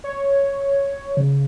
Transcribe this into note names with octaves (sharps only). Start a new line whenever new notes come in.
C#5
C#3